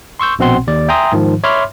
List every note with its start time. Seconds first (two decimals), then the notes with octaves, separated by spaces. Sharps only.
0.20 C6 C#6 E6 G6
0.39 A#1 B2 C4 F#5 C6
0.67 D#2 D5
0.88 E5 G5 G#5 A#5 C6 D#6
1.12 G#2 D#3 F3
1.44 C#5 E5 B5 C6 D6 F6